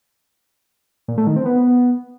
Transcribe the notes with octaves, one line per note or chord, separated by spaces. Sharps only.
A#2
A3
D#3
C4
B3